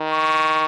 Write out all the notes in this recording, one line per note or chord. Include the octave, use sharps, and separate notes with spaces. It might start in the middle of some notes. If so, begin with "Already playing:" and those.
Already playing: D#3
C#6